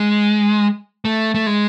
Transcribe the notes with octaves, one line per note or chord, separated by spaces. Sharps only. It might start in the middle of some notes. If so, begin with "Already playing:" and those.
Already playing: G#3
A3
A3
G#3